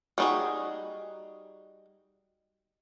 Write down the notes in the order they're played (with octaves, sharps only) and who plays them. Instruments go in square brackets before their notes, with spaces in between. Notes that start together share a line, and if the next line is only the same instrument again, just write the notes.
[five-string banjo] G3 B3 D#4 F#4 G#4